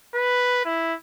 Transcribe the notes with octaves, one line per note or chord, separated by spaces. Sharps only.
B4
E4